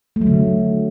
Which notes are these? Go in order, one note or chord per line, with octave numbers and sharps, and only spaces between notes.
A3
F#3
D3